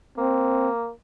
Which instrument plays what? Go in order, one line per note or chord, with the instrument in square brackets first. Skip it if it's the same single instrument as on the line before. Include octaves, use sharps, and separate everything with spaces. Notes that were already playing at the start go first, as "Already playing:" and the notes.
[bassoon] A#3 [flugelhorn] C4